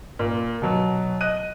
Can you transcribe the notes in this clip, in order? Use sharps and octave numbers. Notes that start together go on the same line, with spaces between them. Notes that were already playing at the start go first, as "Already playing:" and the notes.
A#2
B2 F#3
D#5 F#6 D#7